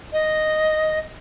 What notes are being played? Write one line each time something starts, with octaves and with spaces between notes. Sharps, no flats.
D#5